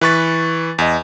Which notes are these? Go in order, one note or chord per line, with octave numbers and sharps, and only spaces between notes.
E3 B4 C#6 A6
E2 D#5